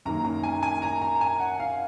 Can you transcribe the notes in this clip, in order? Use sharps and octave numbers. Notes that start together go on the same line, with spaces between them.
F#2 D#3 A#3 A#5
A#5
G#5
G#5
A#5
A#5
G#5
F#5
F5